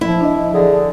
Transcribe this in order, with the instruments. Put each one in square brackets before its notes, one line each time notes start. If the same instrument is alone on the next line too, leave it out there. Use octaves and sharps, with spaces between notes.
[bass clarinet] F3 [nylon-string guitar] E4
[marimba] D4 D#5
[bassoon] D3 [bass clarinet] G#4